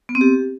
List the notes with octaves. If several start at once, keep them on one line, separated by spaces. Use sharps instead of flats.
B3
C4
G4